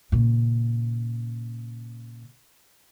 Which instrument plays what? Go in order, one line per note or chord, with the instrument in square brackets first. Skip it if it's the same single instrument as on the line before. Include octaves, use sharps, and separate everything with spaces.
[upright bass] A#2 C#3